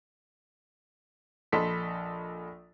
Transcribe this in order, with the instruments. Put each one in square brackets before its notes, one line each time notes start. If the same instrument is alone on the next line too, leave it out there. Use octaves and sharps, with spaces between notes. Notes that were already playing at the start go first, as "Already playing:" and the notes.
[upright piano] A#1 A4 D#5 B5 C6 B6